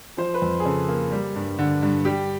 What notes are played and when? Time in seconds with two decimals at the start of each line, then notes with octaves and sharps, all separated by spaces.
0.17 F3 C5
0.34 B4
0.42 F2
0.60 G#4
0.65 C#3 A4
0.89 A#3
1.11 G3
1.36 G2
1.59 D3
1.82 G2
2.05 G3 G4